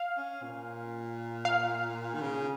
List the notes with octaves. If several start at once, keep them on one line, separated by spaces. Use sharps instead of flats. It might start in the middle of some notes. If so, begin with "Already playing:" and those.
Already playing: F5
C#4
A#2
F5
D#3
C#3